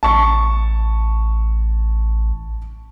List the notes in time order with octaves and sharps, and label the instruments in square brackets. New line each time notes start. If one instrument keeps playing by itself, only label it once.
[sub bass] A1 [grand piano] A5 C#6